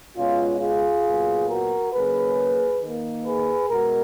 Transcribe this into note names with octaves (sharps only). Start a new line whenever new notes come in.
B2 G#3 B3 C#4 F4
F4 G#4
A#2 F#3 B3
F#4 A#4
C#3 F#3 A#3 G#4 B4
D#3 A#3
G#4 B4
B2 G#3 B3 F#4 A#4